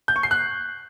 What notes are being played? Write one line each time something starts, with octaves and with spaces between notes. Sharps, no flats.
G6
C#6
C7
F#6